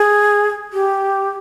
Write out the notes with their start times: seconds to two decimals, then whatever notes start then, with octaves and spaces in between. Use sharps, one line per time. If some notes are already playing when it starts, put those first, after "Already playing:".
Already playing: G#4
0.73 G4